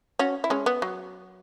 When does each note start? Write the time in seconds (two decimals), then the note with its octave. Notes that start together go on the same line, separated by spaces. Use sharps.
0.19 C#4 F#4
0.44 E4
0.50 G#3 C#4
0.66 B3
0.82 F#3